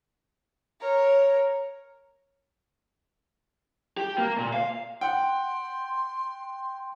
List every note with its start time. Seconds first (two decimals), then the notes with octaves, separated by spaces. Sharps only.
0.80 A#4 C#5
3.97 G4
4.18 A#3
4.38 A#2
4.54 F5
5.01 F#5 G5 C6